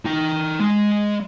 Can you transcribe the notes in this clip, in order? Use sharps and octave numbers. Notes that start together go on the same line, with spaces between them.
D#4 G5
G#3